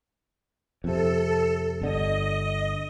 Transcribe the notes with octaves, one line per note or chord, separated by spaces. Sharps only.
F2 C3 A4
G1 D3 D#5